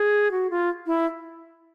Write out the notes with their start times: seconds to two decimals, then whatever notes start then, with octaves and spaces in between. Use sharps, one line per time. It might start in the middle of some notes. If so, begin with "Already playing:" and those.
Already playing: G#4
0.31 F#4
0.50 F4
0.86 E4